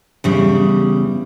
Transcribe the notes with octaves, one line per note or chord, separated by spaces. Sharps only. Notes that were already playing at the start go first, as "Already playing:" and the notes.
E2 C#3 G3